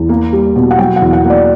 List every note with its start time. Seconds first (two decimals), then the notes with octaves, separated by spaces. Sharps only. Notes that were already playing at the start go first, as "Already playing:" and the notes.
Already playing: E2
0.09 A#3
0.33 G3
0.56 B2
0.71 F#5
0.79 F#3 G5
0.96 F#5
1.02 E2
1.13 F#5
1.24 A#3
1.30 D5